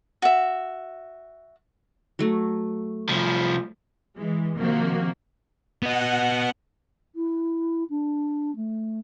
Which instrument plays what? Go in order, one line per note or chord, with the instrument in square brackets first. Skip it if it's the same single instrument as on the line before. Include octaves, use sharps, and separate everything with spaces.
[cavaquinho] F#4 E5
[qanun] F#3 A3
[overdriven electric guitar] C2 F3
[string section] E3 G#3
C3 D#3 F3 A#3 F#4
[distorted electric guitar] B3 D#5 [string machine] F#5
[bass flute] E4
D4
A3